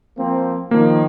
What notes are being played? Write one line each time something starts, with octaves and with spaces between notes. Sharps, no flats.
F3 A#3 C4
D#3 F3 A#3